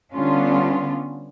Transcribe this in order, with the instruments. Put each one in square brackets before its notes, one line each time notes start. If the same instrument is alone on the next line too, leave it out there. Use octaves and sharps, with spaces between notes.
[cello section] D3 G3 B3 C#4 D4 F4